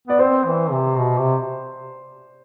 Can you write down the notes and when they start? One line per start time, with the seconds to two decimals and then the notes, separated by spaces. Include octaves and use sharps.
0.07 B3 D5
0.19 C4 C5
0.45 E3
0.71 C3
0.98 B2
1.18 C3